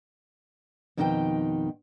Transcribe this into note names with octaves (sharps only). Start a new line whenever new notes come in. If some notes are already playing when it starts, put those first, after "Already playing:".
F2 B2 D#3 D#4 A4 G5